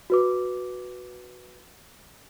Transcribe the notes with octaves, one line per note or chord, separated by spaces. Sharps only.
F#4 B4 D6